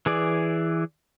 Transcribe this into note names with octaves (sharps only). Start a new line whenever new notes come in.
E3 G#4 D5